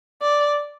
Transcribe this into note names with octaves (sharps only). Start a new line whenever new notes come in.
D5